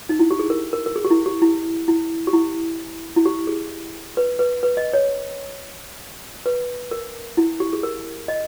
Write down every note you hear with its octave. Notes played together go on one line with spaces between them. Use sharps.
D#4
E4
G4
G#4
A#4
A#4
A#4
G#4
G4
E4
G4
E4
E4
G4
E4
E4
G4
G#4
B4
B4
B4
D#5
C#5
B4
A#4
E4
G4
G#4
A#4
D#5